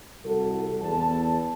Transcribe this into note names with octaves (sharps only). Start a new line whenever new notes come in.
C2 F#4 A4
E2 A5